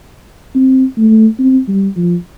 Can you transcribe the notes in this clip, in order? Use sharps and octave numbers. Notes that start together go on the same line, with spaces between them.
C4
A3
C4
G3
F3